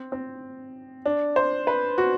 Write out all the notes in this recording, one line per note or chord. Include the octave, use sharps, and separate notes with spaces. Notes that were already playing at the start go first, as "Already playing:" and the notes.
Already playing: C4
C4
D4
C5
B4
F#4